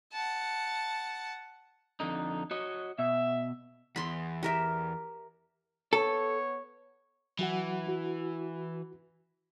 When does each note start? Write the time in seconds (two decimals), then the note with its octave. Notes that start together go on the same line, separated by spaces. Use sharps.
0.12 F#5 A5
2.00 F2 D3 D#4
2.51 F#4 C#5 D#5
2.99 B2 E5
3.96 E2 B5 C6
4.43 G4 A#4 E5
5.93 B3 A4 C#5
7.39 E3 F#3 F#4 F#5
7.87 E4 F#4